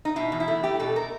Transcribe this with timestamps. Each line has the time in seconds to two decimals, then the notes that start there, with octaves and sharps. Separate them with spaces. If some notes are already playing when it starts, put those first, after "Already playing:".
0.05 D#4
0.16 B2 E4
0.32 E2
0.40 E4
0.48 A3
0.64 A3 G4
0.79 B2 A4
0.96 A#4